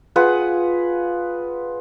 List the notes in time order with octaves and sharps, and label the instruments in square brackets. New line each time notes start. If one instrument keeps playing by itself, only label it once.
[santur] F4 G#4 B4 F#5